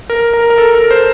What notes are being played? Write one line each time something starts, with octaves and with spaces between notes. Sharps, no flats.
A#4
A#4
A#4
A4
A#4
C5